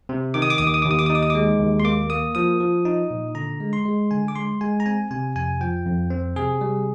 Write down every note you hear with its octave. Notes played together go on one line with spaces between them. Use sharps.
C3
D#3 D6
D#6
D6
D#2 D#6
D6
D#6
D#2 D6
D#6
D6
D#6
D#4
D6
D#6
G#3 D6
D#2
C6
A#3 D6
A#3 D#6
F3 D#6
F3
D#4
A#2
D3 A#5
G#3
C6
G#3
D3 G#5
D6
G#3 C6
G#3 G#5
A#5
C4 G#5
C3 G#5
F2 G#5
F3 G5
F2
C4
C3 G#4
G3